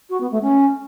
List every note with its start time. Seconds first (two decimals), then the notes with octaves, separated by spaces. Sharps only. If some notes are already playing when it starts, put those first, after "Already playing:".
0.10 F#4
0.20 B3
0.31 A3
0.42 C#4